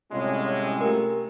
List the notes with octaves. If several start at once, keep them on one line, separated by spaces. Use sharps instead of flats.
A2 C3 G3 G#3 C#4 F4 D#5
A3 G4 A#4